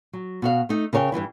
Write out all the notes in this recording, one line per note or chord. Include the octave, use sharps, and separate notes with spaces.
F#3
B2 F#4 F5
A3 D#4
C#3 A#4 C#5 F5 G5
G2 B2 E3 E4